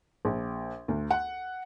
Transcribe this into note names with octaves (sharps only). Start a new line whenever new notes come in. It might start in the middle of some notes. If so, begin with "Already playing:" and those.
A#1
D2
F#5